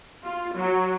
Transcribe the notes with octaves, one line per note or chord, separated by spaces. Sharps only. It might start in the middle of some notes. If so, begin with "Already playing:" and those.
F4
F#3